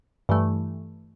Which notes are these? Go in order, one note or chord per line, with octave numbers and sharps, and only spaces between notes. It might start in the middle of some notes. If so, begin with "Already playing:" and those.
G2 E3 A3